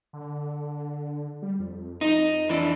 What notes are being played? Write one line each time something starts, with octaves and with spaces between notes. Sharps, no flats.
D3
G3
F2
D#4
E3 D4